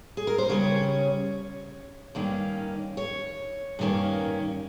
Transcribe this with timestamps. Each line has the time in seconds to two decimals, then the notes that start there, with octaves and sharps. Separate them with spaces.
0.17 G#4
0.27 A#4
0.38 C5
0.49 C#3 G3 C#4 C#5
2.15 G2 D#3 A#3 C#4
2.97 C#5
3.79 G2 D#3 A#3 C#4